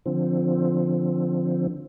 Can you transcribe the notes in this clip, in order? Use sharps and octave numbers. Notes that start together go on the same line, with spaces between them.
D3 F3 C4